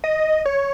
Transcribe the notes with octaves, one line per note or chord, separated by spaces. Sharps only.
D#5
C#5